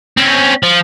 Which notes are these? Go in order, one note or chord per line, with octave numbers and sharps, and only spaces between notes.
C4 C#4
F3